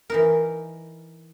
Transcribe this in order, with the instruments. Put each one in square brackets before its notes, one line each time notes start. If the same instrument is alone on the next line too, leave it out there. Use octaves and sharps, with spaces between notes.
[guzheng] E3 D#4 A#4